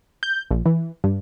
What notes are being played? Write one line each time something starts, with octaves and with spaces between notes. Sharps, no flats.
G6
A#1
E3
G2